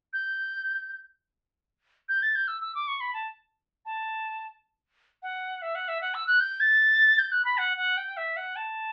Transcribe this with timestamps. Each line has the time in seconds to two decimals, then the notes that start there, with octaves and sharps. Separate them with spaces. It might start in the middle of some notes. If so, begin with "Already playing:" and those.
0.13 G6
2.09 G6
2.23 A6
2.35 G6
2.48 E6
2.61 E6
2.75 D6
2.88 C#6
3.01 B5
3.14 A5
3.86 A5
5.23 F#5
5.62 E5
5.75 F#5
5.88 E5
6.01 F#5
6.14 E6
6.27 F#6
6.40 G6
6.60 A6
7.19 G6
7.32 F#6
7.45 B5
7.58 F#5
7.77 F#5
7.97 G5
8.17 E5
8.37 F#5
8.56 A5